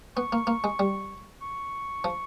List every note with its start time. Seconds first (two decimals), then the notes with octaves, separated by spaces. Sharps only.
0.16 B3 C#6
0.32 A#3
0.47 A#3
0.64 G#3
0.79 G3
1.42 C#6
2.04 F3